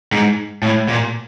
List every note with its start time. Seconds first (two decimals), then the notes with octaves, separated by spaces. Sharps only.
0.12 G#2
0.63 A2
0.88 A#2